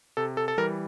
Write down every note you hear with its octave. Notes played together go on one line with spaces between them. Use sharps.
C3 A4
A4
A4
E3 G3 A#4